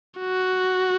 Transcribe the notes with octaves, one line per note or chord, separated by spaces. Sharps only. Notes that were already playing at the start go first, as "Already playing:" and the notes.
F#4